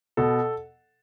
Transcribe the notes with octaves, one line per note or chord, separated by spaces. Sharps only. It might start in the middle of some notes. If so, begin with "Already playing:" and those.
B2 A4